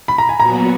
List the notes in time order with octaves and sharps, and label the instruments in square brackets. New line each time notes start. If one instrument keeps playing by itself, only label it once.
[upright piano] B5
A#5
G#5
[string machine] A#2 F#3 B3 F#4 [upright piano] A#5